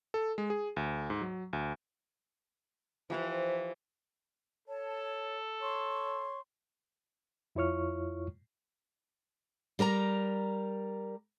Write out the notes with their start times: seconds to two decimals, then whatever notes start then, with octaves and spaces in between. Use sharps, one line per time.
0.14 A4
0.38 G#3
0.50 G#4
0.76 D2
1.10 G#2
1.21 F#3
1.53 D2
3.10 E3 F3 G4 C5 F5
4.68 A4 C#5 A5
5.61 C#5 C6 C#6
7.55 F2 E4 F4 C#5 C#6 F6
9.79 G3 A#4 A5 A#5